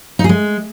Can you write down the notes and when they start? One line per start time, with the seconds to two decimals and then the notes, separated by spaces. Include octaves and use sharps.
0.19 D#4
0.24 G#4
0.29 G#3